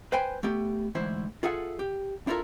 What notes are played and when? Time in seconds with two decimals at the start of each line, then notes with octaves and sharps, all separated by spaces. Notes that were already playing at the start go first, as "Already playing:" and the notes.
0.12 B4 C5 G5 G#5 B5
0.43 A3 B3 G4
0.95 D2 G#2 E3 E4 C5
1.43 F4 G#4 A4 E5 F#5
1.79 G4
2.27 D4 E4 F4 A4 A#4